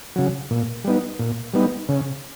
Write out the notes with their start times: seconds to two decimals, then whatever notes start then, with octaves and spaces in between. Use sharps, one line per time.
0.16 C#3 F#3
0.51 A#2
0.84 G3 B3 D#4
1.19 A#2
1.54 G3 B3 D#4
1.89 C#3